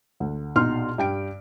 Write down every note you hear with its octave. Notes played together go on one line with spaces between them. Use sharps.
D2
A#1 B2 D#4 C6 F6
G2 G5 D7